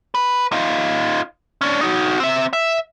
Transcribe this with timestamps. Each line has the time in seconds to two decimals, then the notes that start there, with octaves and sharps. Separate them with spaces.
0.15 B4
0.52 D#4 F4
1.61 C#4 D4
1.81 D#4 F#4
2.20 C4 E5
2.53 E5